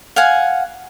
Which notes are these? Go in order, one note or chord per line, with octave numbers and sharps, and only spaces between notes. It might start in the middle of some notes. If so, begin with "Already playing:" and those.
F5 F#5 G#5